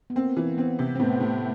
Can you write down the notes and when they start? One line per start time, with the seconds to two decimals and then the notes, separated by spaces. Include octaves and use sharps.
0.10 B3
0.16 A#3 C4
0.37 E3
0.58 B3 C4
0.79 C3
0.95 C4
1.00 A2 B3
1.20 A2